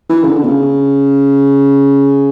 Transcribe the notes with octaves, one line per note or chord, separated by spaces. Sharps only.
E3
C#3
D3
A#2
C#3